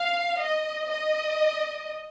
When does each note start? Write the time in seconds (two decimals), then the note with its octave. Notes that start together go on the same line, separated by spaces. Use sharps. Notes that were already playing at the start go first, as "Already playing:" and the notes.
Already playing: F5
0.40 D#5
0.89 D#5